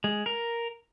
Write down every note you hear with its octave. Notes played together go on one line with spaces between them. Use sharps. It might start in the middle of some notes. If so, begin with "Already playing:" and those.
G#3
A#4